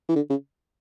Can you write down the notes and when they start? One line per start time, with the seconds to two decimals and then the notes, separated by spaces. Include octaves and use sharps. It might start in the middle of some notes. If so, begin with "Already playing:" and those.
0.09 E3
0.16 D3
0.30 C#3